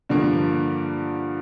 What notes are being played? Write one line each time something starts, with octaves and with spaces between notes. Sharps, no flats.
G2 D3 F3 A#3